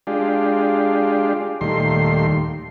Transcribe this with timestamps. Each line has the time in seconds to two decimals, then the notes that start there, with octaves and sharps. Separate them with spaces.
0.07 G#3 D4 F4 G4
1.61 D#2 A#2 D#3 G3 A3 C6